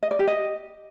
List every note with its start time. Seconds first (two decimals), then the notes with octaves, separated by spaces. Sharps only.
0.03 D#5
0.11 D5
0.19 G4
0.27 D#5